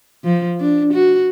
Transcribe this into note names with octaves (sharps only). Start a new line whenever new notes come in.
F3
D4
F#4